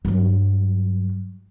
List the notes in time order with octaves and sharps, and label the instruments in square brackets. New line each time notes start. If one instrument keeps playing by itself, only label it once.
[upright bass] G2 F#3